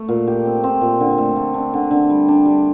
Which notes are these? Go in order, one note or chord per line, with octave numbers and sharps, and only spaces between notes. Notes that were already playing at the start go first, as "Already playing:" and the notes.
Already playing: A3
A#2
G4
C4
C4
A#2
D3
A3
A3
D4
D3
D3
G3
D4
G3